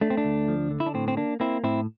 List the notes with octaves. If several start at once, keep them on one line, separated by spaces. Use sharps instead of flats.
A3 D4
C4
D4
D2
F3
D3
E4
D4
A2 C4
C4
A#3 D4
A#3 C4 E4
A2 C4 E4